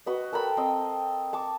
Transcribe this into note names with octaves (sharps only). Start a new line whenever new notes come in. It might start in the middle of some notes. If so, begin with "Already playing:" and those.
F#4 B4 D#5
A4 A#4 G5 B5
C4 D#5
A5 C#6 D6